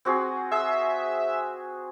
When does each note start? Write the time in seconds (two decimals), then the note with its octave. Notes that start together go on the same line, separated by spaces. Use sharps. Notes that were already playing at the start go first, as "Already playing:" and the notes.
0.05 C4 F#4 G#4
0.52 G#4 E5